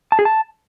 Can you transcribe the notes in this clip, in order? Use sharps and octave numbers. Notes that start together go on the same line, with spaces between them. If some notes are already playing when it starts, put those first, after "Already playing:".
A5
G#4
A5